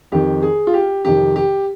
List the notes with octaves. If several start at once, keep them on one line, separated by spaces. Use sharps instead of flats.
F2 D#3 G4
G#4
F4
G4
F2 C3 D#3 G4
G4